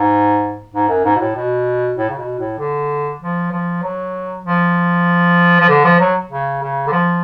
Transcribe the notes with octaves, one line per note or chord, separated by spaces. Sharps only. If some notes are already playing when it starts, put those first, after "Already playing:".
Already playing: G#2
G#2
F#2
G#2
B2
A2
B2
A2
C#3
B2
A2
D3
F3
F3
F#3
F3
F3
D3
F3
F#3
C#3
C#3
D3
F3